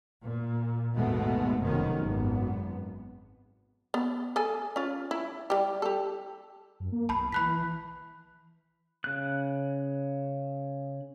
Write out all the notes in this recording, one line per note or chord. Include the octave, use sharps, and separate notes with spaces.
A#2
G#1 D#2 B2 G#3 A3 B3
F1 B1 F#2 C3 D#3 C#4
G#1 F#2 B3
B3
G#4 A4 G#5
C#4 F4
E4
G3 G4
G4 A4
F#2
A#3
B1 A5 B5
E3 B5 F#6 B6
C#3 F#6